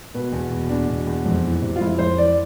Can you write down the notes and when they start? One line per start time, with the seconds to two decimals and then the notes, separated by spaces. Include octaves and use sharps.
0.14 B2 B4
0.32 E2
0.51 B2
0.69 E2 D4
0.88 B2
1.07 E2
1.26 F2
1.44 E3
1.62 C3
1.76 F4
1.81 F2 E4
1.99 F2 C5
2.17 E3 D5